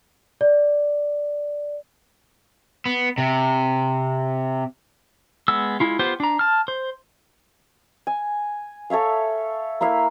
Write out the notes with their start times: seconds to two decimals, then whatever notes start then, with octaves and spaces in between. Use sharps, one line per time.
0.41 D5
2.86 B3
3.18 C3
5.48 G#3 B3 E6
5.80 G#3 E4 F4
5.99 B3 F4 G4 C5
6.20 D4 A#5
6.39 A5 F6
6.68 C5
8.07 G#5
8.90 A4 C#5 E5 F5
9.81 A#3 E4 E5 F5